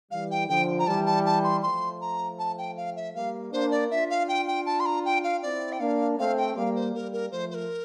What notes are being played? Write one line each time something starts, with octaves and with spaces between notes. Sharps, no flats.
E3 G3 F5
G5
D3 F3 G5
A#5
E3 G3 A5
A5
A5
C6
F3 A3 C6
A#5
A5
G5
F5
E5
G3 A#3 F5
A#3 D4 C5
D5
D4 F4 E5
F5
G5
G5
A5
C6
A#5
G5
F5
C4 E4 D5
G5
A#3 D4 F5
A3 C4 F5
G5
G3 A#3 F5
C5
G3 A#3 A#4
A#4
F3 A3 C5
C5
A#4